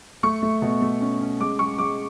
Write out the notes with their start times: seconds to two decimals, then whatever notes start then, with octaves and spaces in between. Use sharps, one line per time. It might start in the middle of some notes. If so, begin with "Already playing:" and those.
0.23 A3 C#6
0.42 A3
0.62 B2
0.82 A3
1.01 C#4
1.21 C#4
1.40 G#3 D6
1.59 G#3 C#6
1.78 G#3 D6